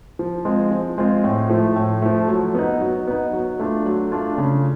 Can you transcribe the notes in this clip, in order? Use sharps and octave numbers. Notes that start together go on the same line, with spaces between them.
F3
G#3 C4 F4
F3
G#3 C4 F4
A2
F3 A3
A2
F3 A3
F#3
B3 D#4
F#3
B3 D#4
F#3
A3 D4 F4
F#3
A3 D4 F4
C#3